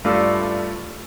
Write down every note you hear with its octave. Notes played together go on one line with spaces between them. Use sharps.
G2 A3 F4 D5 E6